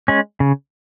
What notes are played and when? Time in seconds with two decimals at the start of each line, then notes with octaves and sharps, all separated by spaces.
0.08 G#3 C#4
0.40 C#3